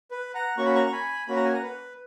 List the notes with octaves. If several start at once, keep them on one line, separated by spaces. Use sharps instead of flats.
B4
F#5 A#5
A#3 C#4 F#4 C#6
B5
A#5 C#6
C#6
G#5 B5
A#3 C#4 F#4 B5
A#5
G#5
F#5 A#5
B4